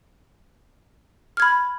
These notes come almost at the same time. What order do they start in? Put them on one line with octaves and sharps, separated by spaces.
F6 G#6 B5